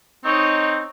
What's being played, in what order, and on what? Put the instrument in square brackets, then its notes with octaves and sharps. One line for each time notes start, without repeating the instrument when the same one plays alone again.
[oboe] C4 [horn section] D#4 [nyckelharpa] C#5